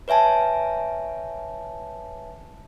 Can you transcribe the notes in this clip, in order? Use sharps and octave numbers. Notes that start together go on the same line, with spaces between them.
B4 C#5 E5 G#5 A5